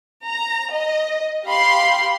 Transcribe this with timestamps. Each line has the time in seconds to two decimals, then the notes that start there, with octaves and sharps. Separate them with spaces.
0.24 A#5
0.73 D#5
1.45 G4 F5 B5 C6